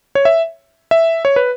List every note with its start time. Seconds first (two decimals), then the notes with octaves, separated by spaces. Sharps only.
0.15 C#5
0.25 E5
0.91 E5
1.25 C#5
1.36 B4